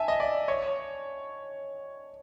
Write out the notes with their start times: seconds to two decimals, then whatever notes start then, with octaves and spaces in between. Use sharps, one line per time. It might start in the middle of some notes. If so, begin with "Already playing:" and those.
Already playing: E5 G#5 A5
0.08 D#5
0.20 D5
0.48 C#5